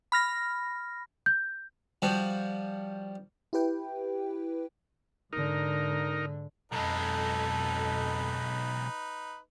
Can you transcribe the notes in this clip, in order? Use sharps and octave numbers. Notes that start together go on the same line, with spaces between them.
B5 F6 A#6
G6
F3 G3 F#4
E4 G4 B4 G5
G#2 D3 D#4 A#4
B1 F2 G#3 D#4 A4 B4